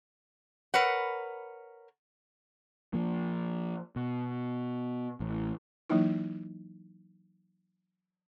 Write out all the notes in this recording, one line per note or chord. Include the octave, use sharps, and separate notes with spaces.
A#4 B4 C#5 F#5
F3 A#3
B2
A1
E3 F#3 A#3 D#4 E4